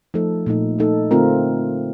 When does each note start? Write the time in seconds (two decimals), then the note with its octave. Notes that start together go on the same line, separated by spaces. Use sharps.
0.14 F3 A3 D#4 A4
0.46 A#2 A3 D#4
0.79 A3 D#4 A4
1.11 D3 A3 C4 F4 A#4